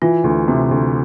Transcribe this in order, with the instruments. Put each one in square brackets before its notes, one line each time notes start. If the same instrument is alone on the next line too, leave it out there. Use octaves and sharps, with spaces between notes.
[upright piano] E3 [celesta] F4
[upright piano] D2
C3
D2